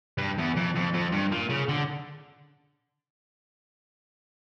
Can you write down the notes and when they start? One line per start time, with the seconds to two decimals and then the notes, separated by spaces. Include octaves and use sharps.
0.18 G2
0.38 E2
0.56 F2
0.75 F2
0.93 F2
1.12 G2
1.32 A#2
1.49 C#3
1.69 D3